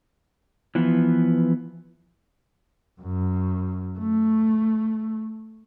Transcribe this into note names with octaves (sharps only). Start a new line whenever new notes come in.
E3 F3 B3
F#2
A3